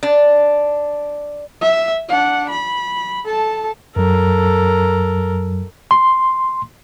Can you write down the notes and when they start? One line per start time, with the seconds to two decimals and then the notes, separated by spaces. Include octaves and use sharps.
0.03 D4
1.61 E5
2.08 D4 F#5
2.49 B5
3.25 A4 A5
3.96 F#2 F#3 A4 A#4
5.91 C6